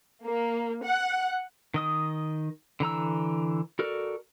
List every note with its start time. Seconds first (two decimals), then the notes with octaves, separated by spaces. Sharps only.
0.24 A#3
0.83 F#5
1.74 D#3 D#5 D#6
2.80 D3 E3 A#5 E6
3.79 F#4 A4 A#4 D5